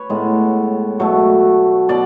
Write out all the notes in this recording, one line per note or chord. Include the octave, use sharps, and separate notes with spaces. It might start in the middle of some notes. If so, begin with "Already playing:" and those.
Already playing: B4 C#5
A2 G#3 B3
B2 F#3 A3
B2 F#3 D5